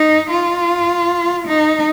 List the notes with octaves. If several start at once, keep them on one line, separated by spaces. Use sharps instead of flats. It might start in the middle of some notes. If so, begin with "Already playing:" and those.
Already playing: D#4
F4
D#4